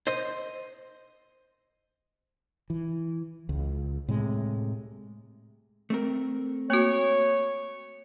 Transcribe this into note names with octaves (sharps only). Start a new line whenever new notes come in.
C5 D#5
E3
C#2
A2 C3 G#3
A3 C4 A#4
A#3 F#4 C#5